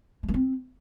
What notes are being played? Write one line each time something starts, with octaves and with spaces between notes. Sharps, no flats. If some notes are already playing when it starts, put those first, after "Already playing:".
G#3
A#3
C4